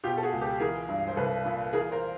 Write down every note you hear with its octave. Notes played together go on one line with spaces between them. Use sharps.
B2 F4 G4
A4
F#4 G#4
C#2
G4 A4
E3 G#4 A#4
G2
C5
C2 A4 B4
A#2
E3 G#4 A#4
A#4 C5